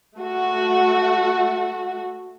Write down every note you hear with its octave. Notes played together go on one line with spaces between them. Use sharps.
A3 F#4